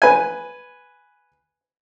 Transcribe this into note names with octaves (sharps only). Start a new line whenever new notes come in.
B4 G#5